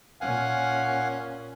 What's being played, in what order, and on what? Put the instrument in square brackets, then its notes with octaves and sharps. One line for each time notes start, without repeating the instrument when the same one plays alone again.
[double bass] A#2 C#4 [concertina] F5 F#5 G#5